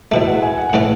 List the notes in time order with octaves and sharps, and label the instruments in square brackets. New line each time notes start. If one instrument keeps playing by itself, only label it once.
[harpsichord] E2 B2 A3 [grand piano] E5
[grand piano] F#5
G#5
F#5
F#5
[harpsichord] A2 E3 A3 C#4 [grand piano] E5